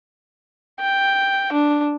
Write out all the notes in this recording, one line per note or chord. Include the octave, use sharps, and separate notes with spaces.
G5
D4